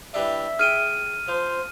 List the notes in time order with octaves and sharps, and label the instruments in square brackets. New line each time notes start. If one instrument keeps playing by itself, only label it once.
[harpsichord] E3 G3 D4 [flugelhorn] E5
[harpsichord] G#4 G5 [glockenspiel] F6 D#7
[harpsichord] F3 [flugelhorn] C5